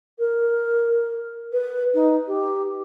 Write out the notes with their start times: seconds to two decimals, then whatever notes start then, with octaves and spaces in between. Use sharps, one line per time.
0.18 A#4
1.52 B4
1.94 D#4
2.27 G4